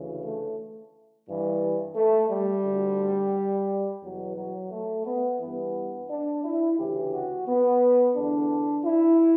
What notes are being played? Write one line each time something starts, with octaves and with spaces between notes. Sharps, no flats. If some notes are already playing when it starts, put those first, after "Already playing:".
Already playing: D2 C#3 E3
A3
G2 E3
A3
G3
D2 D3
E2 B2 F#3
F#3
A3
B3
G2 E3 B3
D4
E4
D2 C#3 E3 G4
F#4
B3
E2 D3 D4
E4